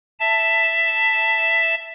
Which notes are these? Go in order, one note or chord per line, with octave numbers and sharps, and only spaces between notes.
E5 A5